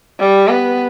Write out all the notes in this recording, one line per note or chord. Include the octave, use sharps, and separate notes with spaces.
G3
B3